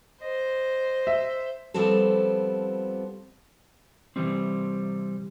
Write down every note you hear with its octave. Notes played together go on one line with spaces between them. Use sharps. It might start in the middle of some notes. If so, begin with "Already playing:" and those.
C5 D#5
E5
F3 G3 B3 C4 A4
C3 D#3 E3 G3 C4